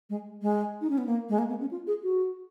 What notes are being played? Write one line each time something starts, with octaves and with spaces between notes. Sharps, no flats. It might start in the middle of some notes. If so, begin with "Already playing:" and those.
G#3
G#3
D#4
C#4
B3
A#3
G#3
A#3
B3
C#4
F4
G#4
F#4